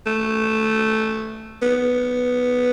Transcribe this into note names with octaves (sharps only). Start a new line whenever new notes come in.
A3
B3